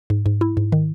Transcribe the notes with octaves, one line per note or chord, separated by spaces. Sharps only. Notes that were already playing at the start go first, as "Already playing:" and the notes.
G#2
G#2
E4
G#2
D#3